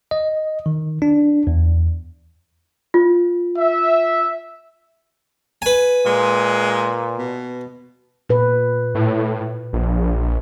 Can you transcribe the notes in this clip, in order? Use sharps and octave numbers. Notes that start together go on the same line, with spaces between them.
D#5
D#3
D4
E2
F4
E5
B4 G#5
A#2 G#3
B2
A#2 B4
A2
A#1